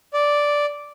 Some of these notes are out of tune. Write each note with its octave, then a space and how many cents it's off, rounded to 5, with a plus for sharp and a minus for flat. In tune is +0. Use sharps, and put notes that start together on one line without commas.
D5 -5